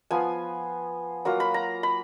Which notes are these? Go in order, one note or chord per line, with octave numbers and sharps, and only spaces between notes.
F3 B3 F4 G#5
F#3 A#3 F4 A#5
B5
A#5
B5